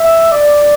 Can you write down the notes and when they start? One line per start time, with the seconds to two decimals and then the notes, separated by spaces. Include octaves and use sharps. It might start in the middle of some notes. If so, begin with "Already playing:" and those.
Already playing: E5
0.32 D5